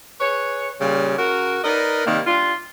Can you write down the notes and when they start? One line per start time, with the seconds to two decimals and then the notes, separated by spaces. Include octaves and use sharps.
0.21 G#4 B4 C#5
0.80 A#2 C#3 G3
1.18 C#3 F#4 A#4
1.64 D#4 A#4 B4 D5 D#5
2.06 C3 D#3 G3 A#3
2.26 G3 D4 F4